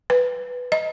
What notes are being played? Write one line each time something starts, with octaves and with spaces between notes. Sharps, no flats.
B4
D#5